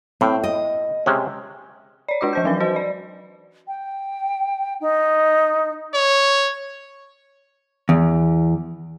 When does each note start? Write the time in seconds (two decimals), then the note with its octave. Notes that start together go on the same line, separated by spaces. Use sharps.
0.21 A2 C4
0.44 D#5
1.06 C3 G#3 C#4
2.08 C#5 D5
2.21 G#3 D4 F#4 D5 D6
2.33 F3 C5 G6
2.44 E3 F#3 C#4 B4
2.60 F#4 C5 D#5
2.76 D5
3.67 G5
4.80 D#4
5.94 C#5
7.89 E2